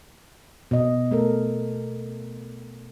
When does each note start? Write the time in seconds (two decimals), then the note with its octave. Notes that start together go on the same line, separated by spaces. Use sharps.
0.71 B2 D#5
1.11 A3 A4 A#4